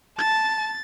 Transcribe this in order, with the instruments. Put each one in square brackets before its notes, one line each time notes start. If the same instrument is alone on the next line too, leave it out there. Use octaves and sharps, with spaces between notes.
[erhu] A5 [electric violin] A6